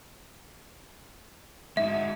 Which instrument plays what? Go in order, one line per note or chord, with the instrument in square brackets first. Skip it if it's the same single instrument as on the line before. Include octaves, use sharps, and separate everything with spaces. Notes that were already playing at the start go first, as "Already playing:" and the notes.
[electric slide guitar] G#3 D#4 F#4 [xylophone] E5